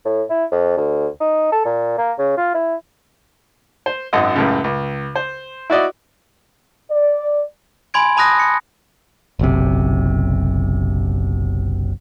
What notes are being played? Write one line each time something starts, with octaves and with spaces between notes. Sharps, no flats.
A2
E4
F2
D2
D#4
A4
A#2
A#3
C#3
F4
E4
C5
G#1 F#2 D#5 F#5
C#2 F#2 A2 C#3
C#2
C5
E4 F#4 D5 D#5
D5
G#5 B5 C6 G#6 D7
A5 B5 D#6 F#6 A#6
C#7
F#1 B1 C3